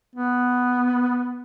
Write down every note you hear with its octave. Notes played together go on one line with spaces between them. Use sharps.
B3